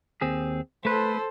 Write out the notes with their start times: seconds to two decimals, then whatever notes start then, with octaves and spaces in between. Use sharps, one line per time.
0.21 D#2 C4 G#4
0.85 A3 A4 B4 C5